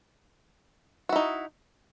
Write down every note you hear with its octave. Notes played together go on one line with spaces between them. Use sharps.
D#4 E4 F#4